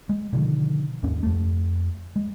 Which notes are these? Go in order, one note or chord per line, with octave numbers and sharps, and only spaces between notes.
G#3
B2 D3 D#3 F3
D#2 G#2 C#4
F2 A3
G#3